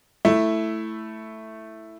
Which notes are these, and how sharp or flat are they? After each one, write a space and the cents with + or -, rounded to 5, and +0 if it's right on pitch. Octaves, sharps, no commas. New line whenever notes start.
A3 +0 E4 +0